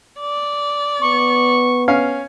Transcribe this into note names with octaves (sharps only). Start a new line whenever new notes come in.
D5
B3 C#6
C#4 F5